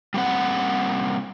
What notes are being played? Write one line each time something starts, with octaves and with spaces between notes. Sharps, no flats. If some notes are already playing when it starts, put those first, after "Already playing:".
G3 A#3 C4 F#5